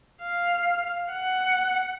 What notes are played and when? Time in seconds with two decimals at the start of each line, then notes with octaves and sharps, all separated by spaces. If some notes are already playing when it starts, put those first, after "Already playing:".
0.22 F5
1.13 F#5